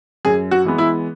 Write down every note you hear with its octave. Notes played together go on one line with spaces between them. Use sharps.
F#2 G#4
F#4
E3 G#3 B3
E4